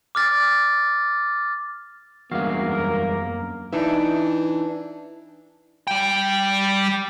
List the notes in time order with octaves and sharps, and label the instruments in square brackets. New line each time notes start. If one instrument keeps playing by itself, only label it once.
[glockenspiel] D6 F6 A6
[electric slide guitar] E2 G2 G#3 [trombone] A#3 [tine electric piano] F#4 F5
[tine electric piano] F#2 A#4
[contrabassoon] E3 [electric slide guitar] D4 D#4 E5
[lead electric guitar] G3 G5